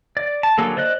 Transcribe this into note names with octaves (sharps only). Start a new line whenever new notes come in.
D5
A5
D3 F#3 A#3 G#4 A4
C5 D5 D#5 F#6